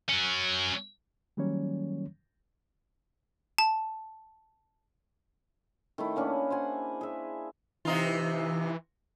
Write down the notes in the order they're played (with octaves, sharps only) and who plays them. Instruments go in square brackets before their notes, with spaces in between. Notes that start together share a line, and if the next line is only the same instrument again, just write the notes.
[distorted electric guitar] F#3 C#4
[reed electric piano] D#3 F#3 G3 A#3 C#4 C#5
[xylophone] A5
[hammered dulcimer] D#3 A3 E4
A#3 C#4 D4 G#4
C5 F#5 G#5
G#4 E5
[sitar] C3 D#4 F4 [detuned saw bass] E3